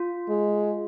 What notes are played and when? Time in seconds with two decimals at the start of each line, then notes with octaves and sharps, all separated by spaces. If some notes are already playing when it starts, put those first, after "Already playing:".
Already playing: F4
0.29 G#3